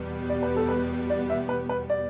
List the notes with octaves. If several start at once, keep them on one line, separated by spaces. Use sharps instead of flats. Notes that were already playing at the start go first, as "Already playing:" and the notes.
Already playing: E2 B2 G3 B3
D5
B4
A4
B4
D5
E5
B4
B4
D5